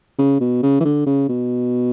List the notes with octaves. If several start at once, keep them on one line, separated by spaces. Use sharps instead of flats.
C#3
B2
C#3
E3
D3
C#3
B2